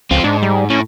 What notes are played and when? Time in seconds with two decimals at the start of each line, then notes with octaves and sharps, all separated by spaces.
0.11 C#2 C4 F4
0.24 G#2 D4
0.43 G3
0.70 A2 C#4